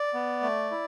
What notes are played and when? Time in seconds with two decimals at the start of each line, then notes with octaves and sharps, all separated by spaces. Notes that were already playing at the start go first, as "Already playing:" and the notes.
Already playing: D5
0.14 B3
0.42 A3
0.71 E4